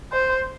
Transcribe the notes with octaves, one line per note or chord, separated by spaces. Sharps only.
C5